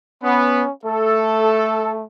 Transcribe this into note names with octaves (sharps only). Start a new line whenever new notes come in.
B3 C#4
A3 A4